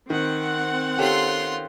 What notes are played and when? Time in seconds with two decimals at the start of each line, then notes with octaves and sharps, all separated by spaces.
0.10 D#3 C4 F#5
0.98 C#4 F4 G4 A4 C6